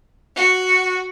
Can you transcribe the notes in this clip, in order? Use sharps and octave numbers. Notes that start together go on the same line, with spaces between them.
F#4